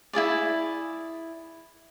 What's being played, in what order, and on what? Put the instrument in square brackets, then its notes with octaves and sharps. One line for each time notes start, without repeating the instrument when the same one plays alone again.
[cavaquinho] E4 F4 G#4 D5